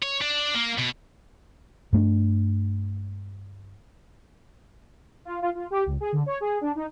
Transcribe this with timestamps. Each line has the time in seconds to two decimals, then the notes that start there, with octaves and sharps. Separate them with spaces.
0.03 C#5
0.22 D4
0.55 A#3
0.78 B2
1.93 G2 A3 B3 D4
5.25 F4
5.42 F4
5.55 F4
5.71 G4
5.86 C#2
6.01 G#4
6.12 D3
6.26 C#5
6.41 G#4
6.61 D4
6.75 D#4